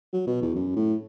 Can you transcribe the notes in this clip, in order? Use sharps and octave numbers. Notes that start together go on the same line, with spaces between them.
F#3
B2
E2
F#2
A2